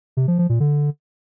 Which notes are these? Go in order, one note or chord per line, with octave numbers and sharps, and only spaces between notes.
C3
F3
F3
A#2
D3